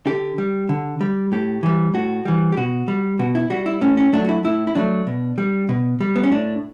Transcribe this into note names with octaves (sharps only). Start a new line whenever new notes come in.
D3 G4
G3
D3
G3
A2 G4
E3 G3
A2 F#4
E3 G3
G4
B2 F#4
G3
B2 F#4
E4
G3 F#4
E4
A2 C#4
C#4
F#3 A3 D4
F#4
E4
A2 E4
E4
F#3 A3 D4
B2
G3
B2
G3
B3
C#4
A2 D4